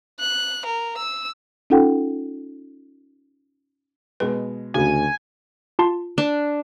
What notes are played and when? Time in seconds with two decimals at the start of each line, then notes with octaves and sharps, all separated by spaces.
0.20 F#6
0.65 A#4
0.97 E6
1.70 C#4 D#4 F4 A4 F#5 G5
4.20 B2 G#3 B4
4.74 D2 C#3 F#4 G#5
5.79 F4 A5 C6
6.18 D4